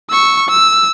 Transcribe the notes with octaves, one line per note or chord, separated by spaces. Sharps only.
C#6 E6
E6